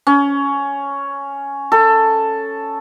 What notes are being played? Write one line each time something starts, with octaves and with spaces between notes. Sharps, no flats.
C#4
A4